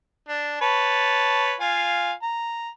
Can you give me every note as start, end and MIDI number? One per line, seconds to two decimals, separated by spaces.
0.29 0.60 62
0.61 1.54 71
0.61 1.54 73
0.61 1.54 81
1.60 2.12 65
1.60 2.12 77
1.60 2.12 80
2.23 2.70 82